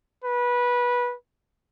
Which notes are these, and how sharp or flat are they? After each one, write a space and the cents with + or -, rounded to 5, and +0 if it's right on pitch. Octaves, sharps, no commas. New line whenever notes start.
B4 -20